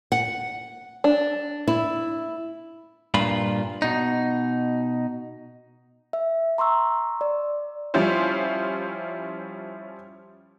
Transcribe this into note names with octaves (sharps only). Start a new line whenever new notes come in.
F#5
D4
E4
G2 A#2 F4 B5
B2 D#4
E5
A#5 C6 C#6 E6
D5
F3 G3 C#4 E4 F4 C5